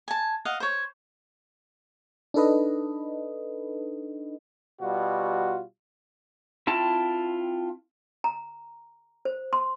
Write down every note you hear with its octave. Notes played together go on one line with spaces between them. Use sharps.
G#5 A5
D#5 F5 F#5
C5 C#5
D4 D#4 A4 B4 D#5
B2 G3 F4 F#4
C4 E4 F4 G5 A5
A#5
C5
C6